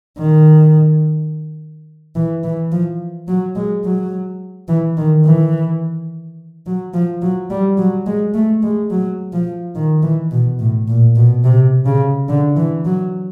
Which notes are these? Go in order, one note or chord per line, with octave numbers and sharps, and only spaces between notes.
D#3
E3
E3
F3
F#3
G#3
F#3
E3
D#3
E3
F#3
F3
F#3
G3
F#3
G#3
A3
G#3
F#3
F3
D#3
E3
B2
A2
A#2
B2
C3
C#3
D3
E3
F#3